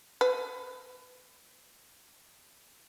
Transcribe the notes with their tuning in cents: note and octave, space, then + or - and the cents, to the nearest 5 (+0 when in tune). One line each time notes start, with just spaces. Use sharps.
B4 +30